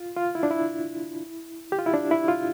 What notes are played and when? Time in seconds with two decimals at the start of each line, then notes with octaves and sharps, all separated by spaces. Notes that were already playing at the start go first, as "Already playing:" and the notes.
Already playing: F4
0.16 F4
0.35 E4
0.43 D4
0.50 E4
1.72 G4
1.79 F4
1.86 E4
1.94 D4
2.11 E4
2.28 F4